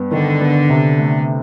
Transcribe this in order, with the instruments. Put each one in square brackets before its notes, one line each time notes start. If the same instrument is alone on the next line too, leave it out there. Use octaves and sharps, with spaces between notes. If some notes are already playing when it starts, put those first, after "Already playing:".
Already playing: [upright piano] G2 B3
[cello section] D3 [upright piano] D#3
[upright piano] B3
C3
A3